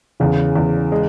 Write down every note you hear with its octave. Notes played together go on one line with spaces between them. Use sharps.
E2 C#3
E2
G#3